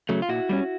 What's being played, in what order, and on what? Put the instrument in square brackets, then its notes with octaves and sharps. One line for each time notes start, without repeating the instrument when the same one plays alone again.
[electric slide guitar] C#3 F#3 A3
F4
A#2 E4 F#4
G3 A#3 C#4